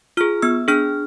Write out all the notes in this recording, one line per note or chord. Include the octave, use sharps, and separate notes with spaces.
F4 G#4 F6
B3 E6
D4 G#4 F6